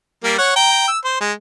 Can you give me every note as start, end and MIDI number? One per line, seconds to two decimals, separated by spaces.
0.24 0.35 55
0.24 0.35 58
0.38 0.55 73
0.38 0.55 78
0.56 0.88 79
0.56 0.88 82
0.88 0.98 88
1.04 1.16 72
1.21 1.32 56